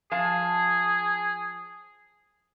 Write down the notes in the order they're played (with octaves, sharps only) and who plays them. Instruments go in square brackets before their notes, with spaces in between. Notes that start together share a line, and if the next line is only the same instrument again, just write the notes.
[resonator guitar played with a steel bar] F3 F5 A5 [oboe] G#4